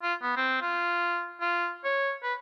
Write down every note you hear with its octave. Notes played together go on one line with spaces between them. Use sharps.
F4
B3
C4
F4
F4
C#5
B4